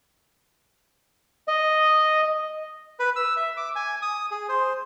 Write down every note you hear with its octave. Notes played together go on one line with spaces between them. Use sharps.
D#5
B4
E6
E5
D6
G#5
D#6
G#4
C5